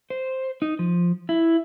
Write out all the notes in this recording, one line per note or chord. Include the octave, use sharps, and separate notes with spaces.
C5
D#4
F3
E4